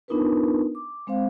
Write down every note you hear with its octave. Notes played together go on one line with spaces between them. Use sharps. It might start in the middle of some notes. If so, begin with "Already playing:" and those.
B3 D4 D#4 F4 A#4 B4
D6
G#3 C4 C5 F5